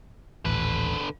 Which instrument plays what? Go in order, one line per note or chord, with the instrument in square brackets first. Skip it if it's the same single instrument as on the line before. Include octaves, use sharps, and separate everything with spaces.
[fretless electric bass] D#1 A1 [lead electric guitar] D3 B4